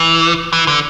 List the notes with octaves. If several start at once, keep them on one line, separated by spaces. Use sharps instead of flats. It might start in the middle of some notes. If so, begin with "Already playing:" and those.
Already playing: E3
E3
D3